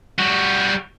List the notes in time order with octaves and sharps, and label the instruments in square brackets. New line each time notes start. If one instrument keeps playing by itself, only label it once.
[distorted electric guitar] G3 F#4